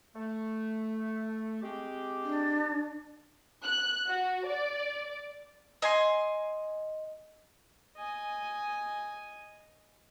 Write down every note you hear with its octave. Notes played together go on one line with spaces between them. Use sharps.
A3
G#3 C4 G4
D4
F#6
F#4
D5
D#5 G#5 C6
D#5 G#5